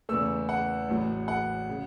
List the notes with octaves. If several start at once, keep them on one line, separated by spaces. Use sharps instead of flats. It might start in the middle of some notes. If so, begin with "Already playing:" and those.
E2 C#3 E3 A3 E6
F#5
A1 A2 F#3
F#5
C#3